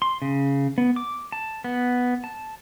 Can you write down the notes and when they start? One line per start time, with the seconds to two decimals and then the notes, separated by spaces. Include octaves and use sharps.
0.02 C6
0.22 C#3
0.78 B3
0.96 D6
1.32 A5
1.64 B3
2.24 A5